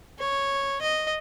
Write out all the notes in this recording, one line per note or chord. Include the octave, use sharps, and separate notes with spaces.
C#5
D#5